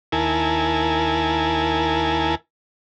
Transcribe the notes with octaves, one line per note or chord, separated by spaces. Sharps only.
D#2 E4 A#4 G#5 A5